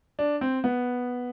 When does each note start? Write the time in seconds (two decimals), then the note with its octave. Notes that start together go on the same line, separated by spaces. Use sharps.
0.19 D4
0.41 C4
0.64 B3